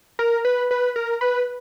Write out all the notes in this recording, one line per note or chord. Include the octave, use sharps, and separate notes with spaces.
A#4
B4
B4
A#4
B4